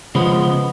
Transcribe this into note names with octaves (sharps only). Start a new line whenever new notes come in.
C#3 F3 G#3 B3